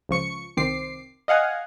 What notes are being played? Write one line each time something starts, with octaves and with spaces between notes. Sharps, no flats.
C#2 F3 C#6 C#7
C2 D#3 C4 D6 C7
D#5 F5 F#5 G#5